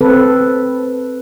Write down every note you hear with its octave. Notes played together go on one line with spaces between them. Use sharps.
C4 A4 B4